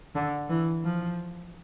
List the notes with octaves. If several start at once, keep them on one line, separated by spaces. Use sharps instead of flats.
D3
E3
F3